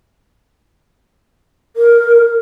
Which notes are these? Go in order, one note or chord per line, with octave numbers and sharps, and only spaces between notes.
A#4